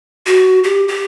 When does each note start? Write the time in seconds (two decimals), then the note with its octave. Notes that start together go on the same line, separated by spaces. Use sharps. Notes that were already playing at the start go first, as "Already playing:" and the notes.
0.26 F#4
0.64 G4
0.88 G4